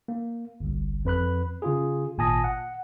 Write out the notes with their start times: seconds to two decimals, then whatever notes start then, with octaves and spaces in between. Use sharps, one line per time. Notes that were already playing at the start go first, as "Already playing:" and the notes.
0.08 A#3
0.60 G1 C2
1.05 F2 B4 B5 F#6
1.62 C#3 F4 G#4
2.18 G#1 A#2 G#5 A5 D#6 A#6
2.44 F#5